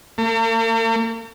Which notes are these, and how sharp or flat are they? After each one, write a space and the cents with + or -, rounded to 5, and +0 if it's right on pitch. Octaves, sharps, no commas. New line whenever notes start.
A#3 -45